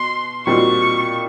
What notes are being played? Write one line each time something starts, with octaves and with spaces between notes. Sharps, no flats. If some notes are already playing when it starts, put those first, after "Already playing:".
Already playing: B2 C6
A#2 G3 C4 D#4 F#4 C#6